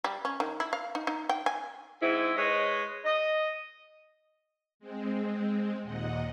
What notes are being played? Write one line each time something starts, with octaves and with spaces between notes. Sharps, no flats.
G3
C#4
D#3
E4
F5
D#4
D#4
G5
G#5
G#2 C4 E4
G#3 B4 C#5 D#5
D#5
G#3 C4
D#2 A#2 D#5 F#5